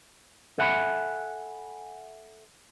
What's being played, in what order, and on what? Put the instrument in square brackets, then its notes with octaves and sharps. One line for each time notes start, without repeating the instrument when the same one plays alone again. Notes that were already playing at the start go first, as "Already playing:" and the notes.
[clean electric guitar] A4 E5 F#5 G#5 B5